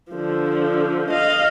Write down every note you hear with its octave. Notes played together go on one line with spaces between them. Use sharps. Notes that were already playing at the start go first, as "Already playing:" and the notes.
D3 F3
D#5 F5